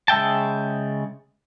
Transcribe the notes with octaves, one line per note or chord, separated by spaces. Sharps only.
C#3 G#3 E5 G5 A5